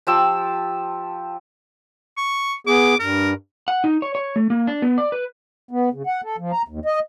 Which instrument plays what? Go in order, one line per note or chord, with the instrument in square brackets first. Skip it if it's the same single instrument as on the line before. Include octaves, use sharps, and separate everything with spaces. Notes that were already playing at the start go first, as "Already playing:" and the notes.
[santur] F3 G4 A5 E6
[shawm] C#6
[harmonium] B3 G#4 [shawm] D6
[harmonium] G2 [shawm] A#4
[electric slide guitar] F#5
D#4
C#5
C#5
A3
A#3
D4
B3
D5
B4
[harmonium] B3
C#3
F#5
A4
F3
A#5
D#2
D#5